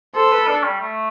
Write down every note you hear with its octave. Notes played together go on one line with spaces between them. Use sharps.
A4 C5
B4
D4
G3
A3